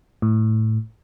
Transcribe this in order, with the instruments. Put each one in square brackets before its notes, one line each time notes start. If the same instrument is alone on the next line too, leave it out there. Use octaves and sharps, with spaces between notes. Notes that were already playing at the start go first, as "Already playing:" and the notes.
[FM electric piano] A2